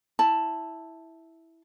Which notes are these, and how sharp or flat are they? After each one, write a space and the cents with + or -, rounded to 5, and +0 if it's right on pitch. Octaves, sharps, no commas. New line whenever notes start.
E4 -5 A5 +0